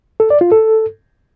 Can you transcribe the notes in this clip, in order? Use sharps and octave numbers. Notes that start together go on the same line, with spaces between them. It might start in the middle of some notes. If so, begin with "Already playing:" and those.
A4
D5
F4
A4